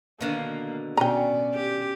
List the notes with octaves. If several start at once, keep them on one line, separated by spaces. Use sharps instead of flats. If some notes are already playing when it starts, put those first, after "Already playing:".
B2 D3 D#3 A#3
B2 C#4 D5 G5 A#5
G4